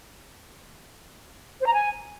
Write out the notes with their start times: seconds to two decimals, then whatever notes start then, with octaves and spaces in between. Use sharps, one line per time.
1.61 C5
1.67 A#5
1.73 G#5